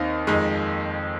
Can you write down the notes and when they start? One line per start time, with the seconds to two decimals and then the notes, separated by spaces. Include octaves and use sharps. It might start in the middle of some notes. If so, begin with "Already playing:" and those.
Already playing: D#2 D#3 C4 D#4 D#5 F5
0.27 F2 D#3 G#3 D#4